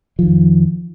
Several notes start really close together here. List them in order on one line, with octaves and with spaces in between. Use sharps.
F3 D#3 F2